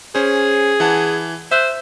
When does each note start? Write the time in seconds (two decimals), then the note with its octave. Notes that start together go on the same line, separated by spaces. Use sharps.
0.15 C#4 G#4 C5
0.80 E3 F#5 A5
1.51 C5 E5 E6 F#6